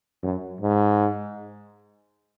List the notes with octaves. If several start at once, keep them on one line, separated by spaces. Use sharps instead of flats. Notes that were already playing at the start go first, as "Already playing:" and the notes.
F#2
G#2